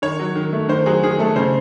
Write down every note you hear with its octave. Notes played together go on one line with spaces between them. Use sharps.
D#3 C#5
F#3
D#3
A3
D#3 C5
F#3 G#4
D#3 G#4
A3 A4
C#3 C5